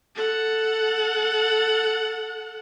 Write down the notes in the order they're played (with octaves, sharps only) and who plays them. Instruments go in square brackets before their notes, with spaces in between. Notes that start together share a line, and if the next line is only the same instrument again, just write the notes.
[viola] A4 F#5